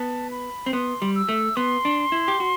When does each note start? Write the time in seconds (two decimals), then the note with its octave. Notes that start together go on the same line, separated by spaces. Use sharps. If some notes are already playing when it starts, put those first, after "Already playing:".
Already playing: B3 A5
0.31 B5
0.66 C4
0.73 B3 C6
1.02 G3
1.15 E6
1.29 A3
1.56 B3 C6
1.85 D4
2.12 E4
2.28 G4
2.40 F#4